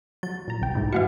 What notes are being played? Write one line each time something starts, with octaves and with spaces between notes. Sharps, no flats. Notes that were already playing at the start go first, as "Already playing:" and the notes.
F#3 A6
A#2 A#5
C2 G5
G#2 E3 E4
F#3 A3 F#4 F5 F#5 C#7